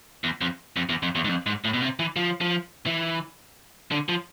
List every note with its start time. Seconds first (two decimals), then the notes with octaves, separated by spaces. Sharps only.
0.24 E2
0.41 F2
0.76 F2
0.89 E2
1.03 F2
1.15 E2
1.24 G#2
1.29 F2
1.46 G#2
1.64 A2
1.73 B2
1.82 C3
1.99 E3
2.16 F3
2.41 F3
2.86 E3
3.92 D3
4.09 F3